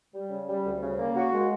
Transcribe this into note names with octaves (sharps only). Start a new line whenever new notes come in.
G3
C#3
G3
D2
C#3
A#3
F#4
G#3